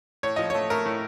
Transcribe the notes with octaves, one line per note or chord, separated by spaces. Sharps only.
A2 C#5
F3 D#5
C#5
A3
A3 A#4
A2